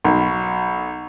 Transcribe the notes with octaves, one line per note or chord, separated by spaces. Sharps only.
B1